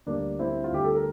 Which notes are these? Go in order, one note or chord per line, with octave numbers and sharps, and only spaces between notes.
D2 D3 G3 A#3 D4
C4 E4
F4
D2 D3 G3 G4
A4
A#4